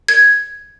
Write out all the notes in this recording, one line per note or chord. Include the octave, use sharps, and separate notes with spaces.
G#6